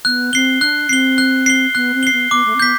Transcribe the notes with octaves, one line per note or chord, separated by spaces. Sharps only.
B3 F#6
C4 C7 G7
D4 F#6
C4 C7 G7
F#6
C7 G7
B3 F#6
C4
C7 G7
B3
B3 D6
A3
C4
B3 G6 B6